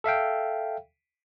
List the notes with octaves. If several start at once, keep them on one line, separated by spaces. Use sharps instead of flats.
A4 E5 F5 G5